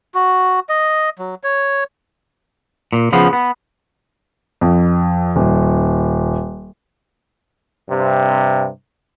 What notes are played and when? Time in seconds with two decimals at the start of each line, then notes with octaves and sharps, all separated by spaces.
0.15 F#4
0.69 D#5
1.19 F#3
1.44 C#5
2.93 A#2
3.13 C#3 F3 B3
3.33 B3
4.61 F2
5.36 D#1
7.89 G2 C3